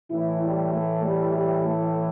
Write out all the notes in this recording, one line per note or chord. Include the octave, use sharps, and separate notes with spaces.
A2 E3 E4
G3
A3
G3
G3
A3